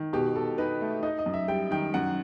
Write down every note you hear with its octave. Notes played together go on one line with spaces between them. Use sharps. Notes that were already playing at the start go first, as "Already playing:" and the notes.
Already playing: D#3
B2 G4
B2 A4
D#4 B4
A3
D#4 D#5
D#5
F#2
E5
G3 G5
D#3 G5
F#2 F#5